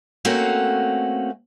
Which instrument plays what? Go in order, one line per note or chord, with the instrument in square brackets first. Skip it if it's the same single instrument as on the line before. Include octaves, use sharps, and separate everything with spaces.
[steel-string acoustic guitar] A3 A#3 C4 C#4 F#4